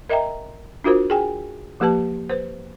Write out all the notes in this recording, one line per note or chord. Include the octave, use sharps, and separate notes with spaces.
A#4 D#5 E5 G5 A#5
D4 F4 F#4 A#4 C5
G#4 G5 G#5
F3 A#3 G4 B4 A5
B4 C5